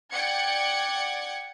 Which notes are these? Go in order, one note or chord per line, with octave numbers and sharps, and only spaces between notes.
D5 F#5 G5 G#6 C#7